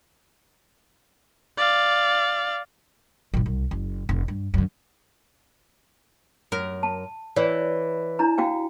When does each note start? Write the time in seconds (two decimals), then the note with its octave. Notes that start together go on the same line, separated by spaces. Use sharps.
1.57 D5 F5
3.34 A#1 G2
3.46 C2
3.71 F#1
4.09 F1
4.28 G2
4.54 F#2 D3
6.52 F#2 A#4
6.83 A5
7.36 E3 C#5 D5
8.19 D4 E4 A#5
8.38 F#4 F5 G5